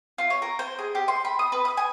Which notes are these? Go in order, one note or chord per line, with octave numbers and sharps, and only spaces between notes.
F4
C#5
A#4
C5
G#4
G4
C6
B5
D#6
B4
D#6
G#5